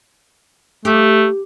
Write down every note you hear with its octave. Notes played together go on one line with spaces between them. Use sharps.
A3 G4